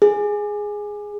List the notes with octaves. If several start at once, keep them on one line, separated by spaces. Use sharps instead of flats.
G#4